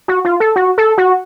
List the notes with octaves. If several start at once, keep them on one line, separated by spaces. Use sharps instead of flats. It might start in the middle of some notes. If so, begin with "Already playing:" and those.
F#4
F4
A4
F#4
A4
F#4